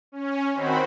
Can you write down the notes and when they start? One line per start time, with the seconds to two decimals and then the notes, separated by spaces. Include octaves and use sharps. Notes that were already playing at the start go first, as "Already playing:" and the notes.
0.12 C#4
0.54 D#3 C4 F#4 C5 B5